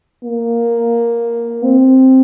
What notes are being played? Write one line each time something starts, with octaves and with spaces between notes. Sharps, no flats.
A#3
C4